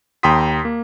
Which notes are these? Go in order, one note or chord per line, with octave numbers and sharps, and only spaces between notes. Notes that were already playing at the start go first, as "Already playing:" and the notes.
D#2 G5 A#5 C6 D#6 B6
A#3